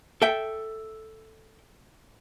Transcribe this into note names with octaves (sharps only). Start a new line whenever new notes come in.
A4 E5 G5